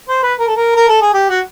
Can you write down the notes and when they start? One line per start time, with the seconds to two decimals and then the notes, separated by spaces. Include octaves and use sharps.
0.09 C5
0.23 B4
0.39 A#4
0.47 A4
0.56 A#4
0.76 A#4
0.89 A4
1.01 G#4
1.14 G4
1.29 F#4